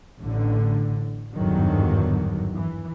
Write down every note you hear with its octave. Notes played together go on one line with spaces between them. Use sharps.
A1 A2 D3
G1 E2 G#2 D3 D#3 F#3
E3